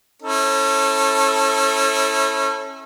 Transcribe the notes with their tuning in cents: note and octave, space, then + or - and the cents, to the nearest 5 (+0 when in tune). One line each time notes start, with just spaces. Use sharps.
C#4 -30 E4 -25 A4 +0